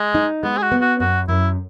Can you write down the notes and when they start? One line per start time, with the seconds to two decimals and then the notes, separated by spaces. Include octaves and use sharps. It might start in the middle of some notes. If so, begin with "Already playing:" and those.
Already playing: G#3
0.15 D#4
0.43 G#3 B3
0.58 G#4
0.62 F#4
0.72 B3
0.81 F#4
1.00 F#2 F#4
1.28 F#2 E4